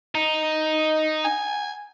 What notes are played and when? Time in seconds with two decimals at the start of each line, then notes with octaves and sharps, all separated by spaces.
0.15 D#4
1.24 G#5